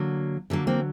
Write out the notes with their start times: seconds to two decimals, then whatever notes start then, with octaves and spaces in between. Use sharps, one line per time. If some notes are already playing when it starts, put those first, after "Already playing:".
Already playing: D3 F#3 A#3
0.50 D3 F#3 A#3
0.67 A#3 C4